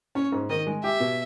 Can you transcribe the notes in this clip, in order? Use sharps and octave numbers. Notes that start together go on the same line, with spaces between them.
C#4 C#5
G#2
D#3 D#5
G#3
G4 E5
B2